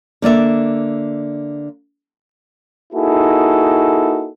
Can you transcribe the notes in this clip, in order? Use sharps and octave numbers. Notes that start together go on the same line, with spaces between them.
D3 A#3 D5 E5
A#3 D#4 E4 F#4 G#4 A4